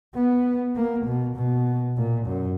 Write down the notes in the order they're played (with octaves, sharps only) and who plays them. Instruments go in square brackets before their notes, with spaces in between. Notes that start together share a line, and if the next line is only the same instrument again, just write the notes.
[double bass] B3
A#3
B2
B2
A#2
F#2